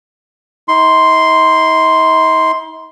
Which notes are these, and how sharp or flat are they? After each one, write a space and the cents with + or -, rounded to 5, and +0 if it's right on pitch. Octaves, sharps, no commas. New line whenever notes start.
D#4 +45 C6 +0